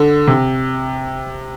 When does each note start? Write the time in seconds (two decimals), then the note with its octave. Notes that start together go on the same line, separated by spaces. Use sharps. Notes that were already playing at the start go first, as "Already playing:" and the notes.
Already playing: D3
0.27 C3